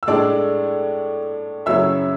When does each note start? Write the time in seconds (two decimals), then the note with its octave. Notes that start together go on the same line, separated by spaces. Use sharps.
0.03 E6
0.07 A2 G#3 D4 D5 D6
1.66 F#2 C#3 F#3 C#4 E4 E5 E6